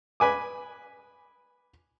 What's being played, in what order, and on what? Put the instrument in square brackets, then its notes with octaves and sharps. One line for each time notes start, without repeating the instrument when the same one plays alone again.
[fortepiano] B4 G#5 D6